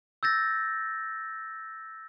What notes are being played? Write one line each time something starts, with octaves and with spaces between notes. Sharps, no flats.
E6 G6 A6 A#6